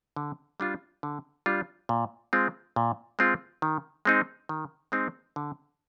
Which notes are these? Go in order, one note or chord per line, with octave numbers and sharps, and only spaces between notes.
D3
G3 D4 F4
D3
G3 D4 F4
A#2
G#3 C4 F4
A#2
G#3 C4 F4
D#3
G#3 C4 D#4
D#3
G#3 C4 D#4
D3